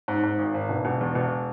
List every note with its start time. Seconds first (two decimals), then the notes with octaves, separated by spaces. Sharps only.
0.08 G#2
0.23 G#2
0.39 G#1
0.54 G#1
0.69 E1
0.85 E1
1.01 E2
1.15 E1